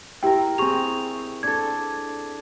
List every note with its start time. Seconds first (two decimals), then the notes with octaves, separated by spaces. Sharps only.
0.23 E4 G4 A#4 G5
0.58 C4 G#4 C#6 F7
1.43 D4 A4 G#6